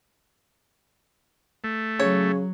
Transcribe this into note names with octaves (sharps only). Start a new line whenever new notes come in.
A3
C#3 F#3 C#5